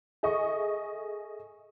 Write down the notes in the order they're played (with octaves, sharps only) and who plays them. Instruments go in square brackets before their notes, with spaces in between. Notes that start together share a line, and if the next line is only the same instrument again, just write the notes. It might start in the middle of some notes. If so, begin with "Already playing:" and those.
[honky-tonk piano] G#4 A4 D#5 E5 C#6